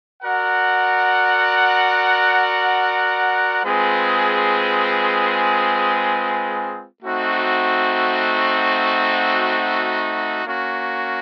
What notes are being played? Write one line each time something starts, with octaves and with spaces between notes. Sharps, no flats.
F#4 A#4 D5 F#5
G#3 C4 F4 G#4 B4
A3 C4 D#4 F#4
A#3 C#4 F#4